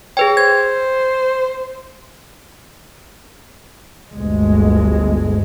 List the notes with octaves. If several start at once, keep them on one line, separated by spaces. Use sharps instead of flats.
G#4 B4 C#5 G5
C5 G#6
G1 D2 G#3